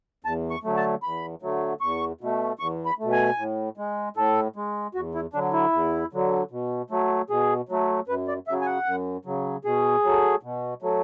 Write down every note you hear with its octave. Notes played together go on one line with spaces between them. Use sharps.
E2 A5
C#6
D3 F#3 A3
A5
E2 B5
D3 F#3 A3
E2 C#6
B2 A3
E2 C#6
B5
A3
B2
G#5
A2
G#3
A2 A4
G#3
E2 F#4
E4
D3 F#3 D4
E4
E2
D3 F#3
B2
F#3 A3
B2 G#4
F#3 A3
F#2 B4
D5
C#3 F#3 E5
G#5
F#5
F#2
C#3 F#3
B2 G#4
F#3 A3
B2
F#3 A3